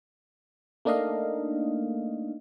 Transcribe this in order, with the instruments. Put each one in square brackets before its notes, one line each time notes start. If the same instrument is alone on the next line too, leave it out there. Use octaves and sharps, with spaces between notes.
[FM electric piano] A3 A#3 D4 D#4 D#5 F5